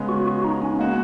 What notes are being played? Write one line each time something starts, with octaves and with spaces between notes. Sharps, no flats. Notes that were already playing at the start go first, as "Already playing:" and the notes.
Already playing: C#3 G#3 B3
F#4
F#4
D#4
C#4
G#3 A#3 D#4 F#4